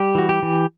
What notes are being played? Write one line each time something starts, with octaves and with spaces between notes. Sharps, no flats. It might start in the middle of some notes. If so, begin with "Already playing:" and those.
Already playing: G3 G4
E3 F#4
G4
E3